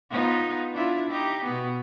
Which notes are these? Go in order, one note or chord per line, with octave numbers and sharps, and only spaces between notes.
B3 D#4 F4
D4 E4 F4
D#4 G4
B2 B3